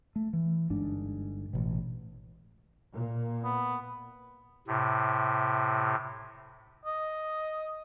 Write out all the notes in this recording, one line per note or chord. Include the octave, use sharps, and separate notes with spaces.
A3
E3
G1 G#2 D4
A1 B2
A#2
B3
A2 C3
D#5